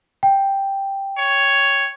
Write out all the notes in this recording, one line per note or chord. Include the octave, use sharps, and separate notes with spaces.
G5
C#5